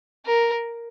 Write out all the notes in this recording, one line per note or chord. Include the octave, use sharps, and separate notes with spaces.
A#4